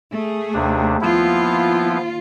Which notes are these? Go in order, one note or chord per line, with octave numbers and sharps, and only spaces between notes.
A3 G#4
D#2 C3 D4
D#2 F3 B3 E4 F4